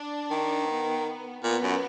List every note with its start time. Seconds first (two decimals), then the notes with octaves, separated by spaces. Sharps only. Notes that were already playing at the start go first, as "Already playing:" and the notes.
Already playing: D4
0.31 D#3
0.69 B3
1.44 A#2 B3
1.63 F#2